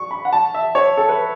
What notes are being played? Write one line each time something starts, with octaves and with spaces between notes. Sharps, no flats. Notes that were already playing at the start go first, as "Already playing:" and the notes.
Already playing: C#6
B5
F#5
A5
E5
C#5
A4
B4